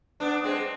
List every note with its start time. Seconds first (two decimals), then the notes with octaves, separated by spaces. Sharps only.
0.20 B3 D4
0.44 G#3 C4